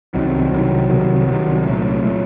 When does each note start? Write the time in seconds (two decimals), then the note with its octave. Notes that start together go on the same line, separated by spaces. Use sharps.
0.14 C2 C3 D#3 F#3
0.51 C2 C3 D#3 F#3
0.90 C2 C3 D#3 F#3
1.27 C2 C3 D#3 F#3
1.65 C2 A#2 F#3 A3
2.04 A#2 F#3 A3